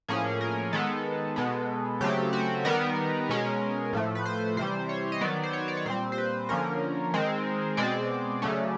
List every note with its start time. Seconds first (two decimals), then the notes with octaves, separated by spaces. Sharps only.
0.08 A2 F3 A#3 C#4 G#4
0.41 A#4
0.73 D#3 G#3 B3 A4
1.36 B2 G#3 B3
2.01 C#3 F#3 A3 C4 G4
2.33 F#4
2.65 D#3 G3 B3 A#4
3.29 B2 G#3 C#4
3.93 A2 F3 A3
4.15 B4
4.25 C5
4.57 C3 E3 G3 C5
4.89 C#5
5.12 D#5
5.21 D#3 F#3 B3 D5
5.43 C5
5.53 C#5
5.68 D5
5.77 C#5
5.86 A#2 G3 C4 C5
6.12 C5
6.18 B4
6.49 D3 F3 A#3 C#4 A#4
7.14 D#3 G#3 C4
7.77 B2 G#3 C4 D5
8.42 C#3 F#3 A3 C#4